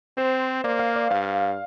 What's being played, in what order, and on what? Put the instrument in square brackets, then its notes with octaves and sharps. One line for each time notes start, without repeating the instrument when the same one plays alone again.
[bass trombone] C4 [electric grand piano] C5
[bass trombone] A#3 [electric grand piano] D5
[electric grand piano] F5
D5
[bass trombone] G2 [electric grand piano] F5